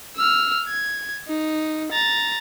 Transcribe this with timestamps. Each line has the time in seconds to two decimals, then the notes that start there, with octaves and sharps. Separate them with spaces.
0.16 E6 F6
0.68 G#6
1.27 D#4
1.92 A#5 A6